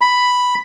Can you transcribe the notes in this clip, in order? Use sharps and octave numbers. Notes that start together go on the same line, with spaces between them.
B5